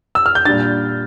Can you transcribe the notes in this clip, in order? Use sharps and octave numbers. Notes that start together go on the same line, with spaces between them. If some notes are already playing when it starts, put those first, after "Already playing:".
E6
F6
G6
A#2 G3 D4 A6